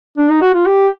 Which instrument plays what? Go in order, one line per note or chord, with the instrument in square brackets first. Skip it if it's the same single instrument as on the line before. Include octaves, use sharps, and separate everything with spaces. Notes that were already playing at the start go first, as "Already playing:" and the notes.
[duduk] D4
D#4
F#4
F4
G4